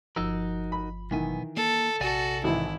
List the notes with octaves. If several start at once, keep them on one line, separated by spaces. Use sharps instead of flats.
G1 F3 D#4 F#4 A#4 E6
B5
B1 D#3 E3 B3 G#5
A#3 A4
A#1 C3 F#4 A4 D5 G#5
G#1 E3 E4